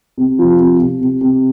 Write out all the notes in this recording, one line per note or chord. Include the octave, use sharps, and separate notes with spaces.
C3
F3
C3
C3
C3
C3